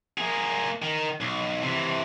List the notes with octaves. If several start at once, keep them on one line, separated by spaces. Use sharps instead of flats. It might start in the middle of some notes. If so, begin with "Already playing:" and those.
A#3 G#4
D#3
B1
C3 E3